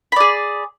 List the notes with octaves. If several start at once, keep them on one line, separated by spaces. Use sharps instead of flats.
G#4 D5 B5